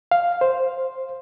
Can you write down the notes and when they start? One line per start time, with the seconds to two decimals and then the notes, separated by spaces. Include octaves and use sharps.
0.11 F5
0.41 C5